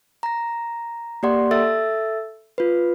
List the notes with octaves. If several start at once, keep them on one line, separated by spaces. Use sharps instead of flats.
A#5 A#6
A#3 G4 D5 F#5 C6
A4 E5 E6 A6
F4 B4